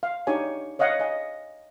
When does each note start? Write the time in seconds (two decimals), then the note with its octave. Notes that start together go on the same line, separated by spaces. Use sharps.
0.03 F5
0.27 D4 D#4 G4 C#5 G#5
0.79 C#5 D#5 F5 F#5
0.99 D#5 G#5